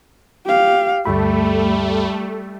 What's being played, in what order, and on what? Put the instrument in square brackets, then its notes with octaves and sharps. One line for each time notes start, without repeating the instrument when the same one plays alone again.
[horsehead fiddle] G4 F5
[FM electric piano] D2 G2 B5 [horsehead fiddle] G3 [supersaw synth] A3